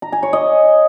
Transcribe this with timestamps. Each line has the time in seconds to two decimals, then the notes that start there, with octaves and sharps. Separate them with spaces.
0.02 A#5
0.12 G#5
0.23 C#5
0.33 D#5